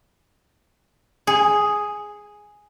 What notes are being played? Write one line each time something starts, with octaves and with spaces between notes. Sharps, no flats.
G#4